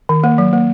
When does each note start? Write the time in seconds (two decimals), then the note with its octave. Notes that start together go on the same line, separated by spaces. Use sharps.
0.09 D#3
0.24 A#3
0.38 F#3
0.53 A#3